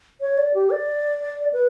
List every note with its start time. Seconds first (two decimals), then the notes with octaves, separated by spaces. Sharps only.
0.21 C#5
0.38 D5
0.54 G4
0.71 D5
1.53 B4